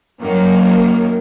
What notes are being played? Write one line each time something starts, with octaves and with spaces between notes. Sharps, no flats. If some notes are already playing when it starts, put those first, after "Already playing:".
F#2 D#3 F#3 A#3